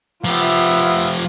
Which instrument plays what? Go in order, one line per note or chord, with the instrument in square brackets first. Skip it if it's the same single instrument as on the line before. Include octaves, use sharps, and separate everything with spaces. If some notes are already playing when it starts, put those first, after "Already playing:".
[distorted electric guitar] F3 G4 [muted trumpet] B3 [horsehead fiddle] F4 F5 [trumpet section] E5